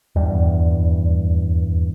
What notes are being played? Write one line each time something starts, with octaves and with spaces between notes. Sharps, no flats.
D#1 E2 G2 G3